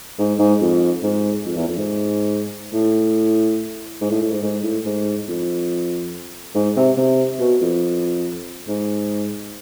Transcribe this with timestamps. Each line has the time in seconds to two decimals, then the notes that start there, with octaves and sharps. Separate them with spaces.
0.18 G#2
0.39 G#2
0.61 F2
1.03 G#2
1.46 F2
1.57 E2
1.68 F2
1.77 G#2
2.73 A2
4.01 G#2
4.11 A2
4.22 A2
4.32 G#2
4.43 G#2
4.64 A2
4.86 G#2
5.28 F2
6.55 G#2
6.76 C3
6.98 C3
7.40 B2
7.61 F2
8.68 G#2